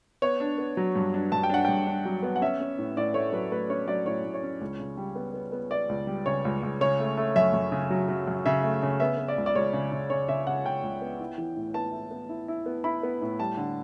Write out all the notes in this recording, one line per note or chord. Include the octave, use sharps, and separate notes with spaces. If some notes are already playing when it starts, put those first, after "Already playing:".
B3 C#5
D4
B3
F#3
G2
D4
G2 A5
G5
D4 F#5
G2 G5
D4
F#3
B3
F#5
C#4 E5
C#4
A2
A2 D5
A3 C#5
F#3 B4
A3 B4
C#4 C#5
F#3 D5
A2 C#5
A2
C#5
C#4
C#2
C#3
G3
B3
B3
B3
B3 D5
C#2
G3
C#3 C#5
C#2
C#2
C#3 C#5
A3
A3
F#2 E5
F#2
C#3
F#3
F#3
F#2
C#3 E5
A3
C#3
B3 E5
B3
D5
C#2
D5
C#2 C#5
C#3
C#3
C#3 C#5
C#3 E5
C#3 F#5
C#3 G5
C#2
B3
E4
E3
A2
B3 A5
E4
B3
E4
E4
B3
E4 B5
B3
A2
G3 A5
D3